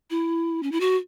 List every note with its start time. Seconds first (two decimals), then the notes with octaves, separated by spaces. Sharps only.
0.10 E4
0.63 C#4
0.72 E4
0.80 F#4